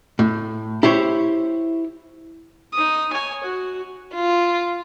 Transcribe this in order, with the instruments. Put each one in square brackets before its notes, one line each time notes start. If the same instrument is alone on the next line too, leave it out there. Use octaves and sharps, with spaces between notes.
[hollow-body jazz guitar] A2
E4 G4 C5 C#5
[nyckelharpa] D#4 D#6
C#5 G#5
F#4
[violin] F4